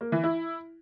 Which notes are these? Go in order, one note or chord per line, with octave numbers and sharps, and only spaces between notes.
A#3
E3
E4